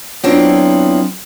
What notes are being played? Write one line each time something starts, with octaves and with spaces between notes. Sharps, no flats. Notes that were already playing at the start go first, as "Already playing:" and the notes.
F#3 B3 C4 D4 E4 F4